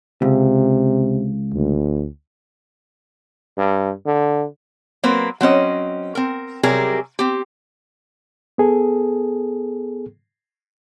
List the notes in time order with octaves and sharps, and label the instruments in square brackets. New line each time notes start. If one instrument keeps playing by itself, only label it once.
[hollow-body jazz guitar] C#2 [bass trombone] C3
[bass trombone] D2
G2
D3
[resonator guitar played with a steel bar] F#3 A#3 C4 A#4 B4
F#3 C4 C#4 D#5
C4 A#4
C3 F#3 G3 G#4 A#4 A#5
C4 G4
[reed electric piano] B3 G#4 A4